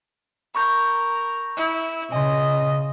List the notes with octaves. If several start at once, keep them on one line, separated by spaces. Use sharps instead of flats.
A#4 B5 C#6 G6
E4
C#3 D#5 G#5 C6